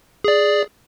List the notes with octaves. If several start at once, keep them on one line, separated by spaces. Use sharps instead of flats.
G#4 D5